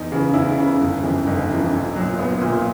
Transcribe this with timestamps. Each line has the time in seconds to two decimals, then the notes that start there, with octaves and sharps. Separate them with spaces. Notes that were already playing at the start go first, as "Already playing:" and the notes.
Already playing: E2 D#4
0.12 C#3 E3
0.34 E2 E4
0.58 C#3 E3
0.81 G1
1.03 F2 C#3 E3
1.27 G1 D#4
1.50 F2 C#3 E3
1.73 A#1
1.95 A#2 F#3
2.19 A#1 B3
2.41 A#2 F#3